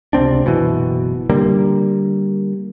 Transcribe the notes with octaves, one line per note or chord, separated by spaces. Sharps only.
C#2 C3 C4 D4
F#1 B2 E3
D3 G3 A#3